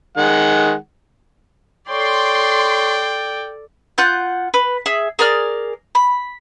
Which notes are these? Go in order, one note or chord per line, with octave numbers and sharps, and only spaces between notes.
D#3 G#3 F#5
A4 C#5 D5 G5 C6
F4 F#5 F#6 G6
B4
G#4 E5
G#4 A#4 D5 F6
B5